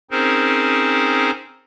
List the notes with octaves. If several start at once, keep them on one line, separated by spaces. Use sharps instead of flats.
C4 C#4 D#4 G#4 A#4 C5